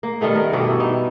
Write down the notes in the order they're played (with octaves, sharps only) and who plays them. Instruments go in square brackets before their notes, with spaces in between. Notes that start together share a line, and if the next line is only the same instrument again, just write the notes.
[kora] A#3
D#3 G3 A3 B3
A#4
G2 B2 B3 D5
E4
D#4